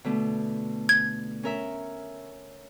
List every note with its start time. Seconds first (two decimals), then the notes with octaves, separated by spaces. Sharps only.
0.04 B2 D3 A3
0.89 G#6
1.43 C#4 A#4 E5